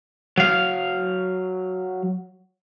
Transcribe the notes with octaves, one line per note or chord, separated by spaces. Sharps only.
F#3 F5